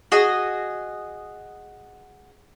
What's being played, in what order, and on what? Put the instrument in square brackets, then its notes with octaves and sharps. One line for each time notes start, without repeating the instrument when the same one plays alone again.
[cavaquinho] F#4 G#4 D#5